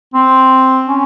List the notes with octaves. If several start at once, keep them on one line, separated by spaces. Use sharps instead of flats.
C4
C#4